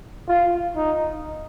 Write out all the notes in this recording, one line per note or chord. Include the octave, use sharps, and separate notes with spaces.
F4
D#4